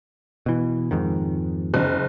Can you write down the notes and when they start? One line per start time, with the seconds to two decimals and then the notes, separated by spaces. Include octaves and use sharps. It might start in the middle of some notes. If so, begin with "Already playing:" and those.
0.46 B2 E3
0.91 F2 G#2 D#3
1.74 F#1